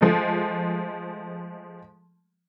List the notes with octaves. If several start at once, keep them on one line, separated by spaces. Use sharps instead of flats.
F3 G#3 A3